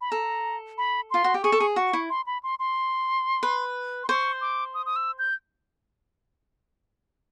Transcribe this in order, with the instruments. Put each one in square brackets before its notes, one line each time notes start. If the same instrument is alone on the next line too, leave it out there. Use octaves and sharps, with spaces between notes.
[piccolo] B5
[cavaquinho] A4 [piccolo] A#5
[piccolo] B5
[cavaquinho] F4 [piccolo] C6
[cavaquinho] F#4
G4
[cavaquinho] G#4 [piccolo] C#6
[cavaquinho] A4
G#4
[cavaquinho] F#4 [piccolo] C#6
[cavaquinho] E4
[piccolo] C6
B5
C6
C6
[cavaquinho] B4
[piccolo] C6
[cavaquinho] C5 [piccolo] C#6
[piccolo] D6
D#6
D#6
E6
G6